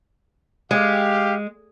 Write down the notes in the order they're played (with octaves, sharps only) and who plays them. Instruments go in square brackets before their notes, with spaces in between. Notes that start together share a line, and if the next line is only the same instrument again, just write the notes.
[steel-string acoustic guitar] G#3 [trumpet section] G4 F5